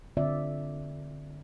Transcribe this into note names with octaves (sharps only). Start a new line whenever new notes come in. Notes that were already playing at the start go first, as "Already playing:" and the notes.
D3 C4 F4 D5 E5